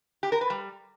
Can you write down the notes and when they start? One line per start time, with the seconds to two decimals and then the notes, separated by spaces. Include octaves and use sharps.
0.23 G4
0.32 A#4
0.41 B4
0.50 G3